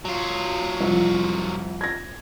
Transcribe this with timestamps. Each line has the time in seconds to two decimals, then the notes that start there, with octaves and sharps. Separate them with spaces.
0.05 F#3 F4
0.81 C2 F2
1.81 G#6 A#6